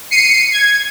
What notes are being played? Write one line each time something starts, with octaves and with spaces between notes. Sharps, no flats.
C7 C#7 D#7
G#6